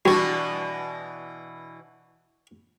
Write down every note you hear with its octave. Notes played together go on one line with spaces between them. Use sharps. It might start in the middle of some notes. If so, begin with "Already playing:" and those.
B2 E3 G3 D4 F#4 C#6